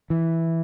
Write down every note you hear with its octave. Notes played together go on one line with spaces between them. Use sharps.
E3